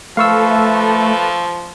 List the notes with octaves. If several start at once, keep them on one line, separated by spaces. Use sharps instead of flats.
F3 A3 A4 B4 F5 C#6 E6